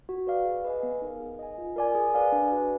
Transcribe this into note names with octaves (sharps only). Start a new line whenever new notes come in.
F#4
B4 D5 F5
G#4
B4 D#5 G#5
B3
D#4 A#4 F5
G#4
D#5 G#5
F4
A#4 D5 G#5
G#4
B4 D5 F5 G#5
D4
F#4 B4